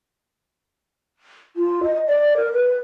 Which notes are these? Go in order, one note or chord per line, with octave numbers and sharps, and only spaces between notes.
F4
D#5
D5
A#4
B4